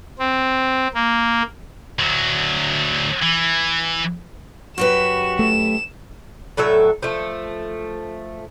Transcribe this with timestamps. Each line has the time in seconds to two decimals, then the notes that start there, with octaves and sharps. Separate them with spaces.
0.19 C4
0.94 A#3
1.99 D2 F#3
3.23 E3
4.78 F#2 F#4 G4 B4 E7
5.39 A3 E7
6.57 A2 F#3 A4 E5
7.03 F3 A3